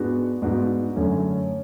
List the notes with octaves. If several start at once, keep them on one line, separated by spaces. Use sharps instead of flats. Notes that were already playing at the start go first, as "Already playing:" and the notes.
Already playing: G#2 G#3 B3 D4 F#4
G#2 G#3 B3 D4 F#4
F#2 D3 A3 C#4